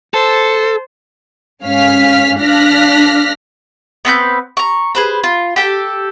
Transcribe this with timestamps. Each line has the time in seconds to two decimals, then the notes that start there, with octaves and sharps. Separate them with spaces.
0.14 A4 C5
1.63 G#2 C#4 F5 F6 B6
2.39 D4 F5 F6 F#6 A#6 B6
4.05 B3 C4 B4 G6
4.57 A#5 C#6
4.95 G#4 B4 C5
5.24 F4
5.56 G4 A4 G5